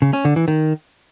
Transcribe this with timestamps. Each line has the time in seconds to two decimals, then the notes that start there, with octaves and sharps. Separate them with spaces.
0.02 C#3
0.13 C#4
0.25 D3
0.36 E3
0.48 D#3